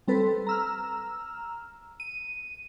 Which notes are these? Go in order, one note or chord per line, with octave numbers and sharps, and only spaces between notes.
G3 C4 A4 B4
A#5 E6 F6
D#7